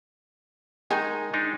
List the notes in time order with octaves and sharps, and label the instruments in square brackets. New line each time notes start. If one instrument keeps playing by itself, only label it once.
[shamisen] D#3 G#4 G#5 [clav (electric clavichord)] G#3 D#4
[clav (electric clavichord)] G#3 D4 D#4